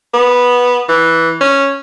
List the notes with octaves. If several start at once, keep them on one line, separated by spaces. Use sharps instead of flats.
B3
E3
C#4